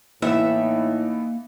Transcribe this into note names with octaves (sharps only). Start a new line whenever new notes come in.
A2 E3 A#3 B3 D#4 E5